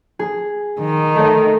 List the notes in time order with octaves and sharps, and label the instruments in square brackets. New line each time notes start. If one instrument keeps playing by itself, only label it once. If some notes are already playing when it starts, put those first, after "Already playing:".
[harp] G#4
[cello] D#3
[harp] A3 D#5